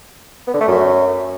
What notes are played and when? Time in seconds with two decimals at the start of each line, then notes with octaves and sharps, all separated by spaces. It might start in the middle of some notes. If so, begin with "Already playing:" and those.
0.47 B3
0.54 D3
0.61 A3
0.68 F#2